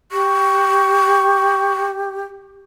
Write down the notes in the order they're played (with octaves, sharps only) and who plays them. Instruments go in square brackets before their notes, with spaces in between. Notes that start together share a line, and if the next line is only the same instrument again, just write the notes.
[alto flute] G4 [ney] C#6